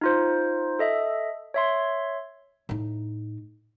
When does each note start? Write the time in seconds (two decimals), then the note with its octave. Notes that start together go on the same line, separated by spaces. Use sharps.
0.01 D#4 F4 C5
0.79 A4 D#5 E5
1.54 C#5 E5 C6
2.69 A2 D#4